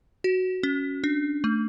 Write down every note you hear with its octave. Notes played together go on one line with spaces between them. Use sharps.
F#4
C#4
D4
A3